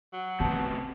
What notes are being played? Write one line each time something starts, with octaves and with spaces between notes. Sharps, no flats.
F#3
C3 A3 B3 A5